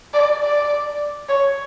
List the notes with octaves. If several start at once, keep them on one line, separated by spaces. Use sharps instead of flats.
D5
D5
C#5